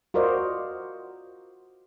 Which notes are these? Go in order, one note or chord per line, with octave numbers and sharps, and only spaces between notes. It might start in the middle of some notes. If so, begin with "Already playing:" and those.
F4 F#4 A#4 C5 D5 D#5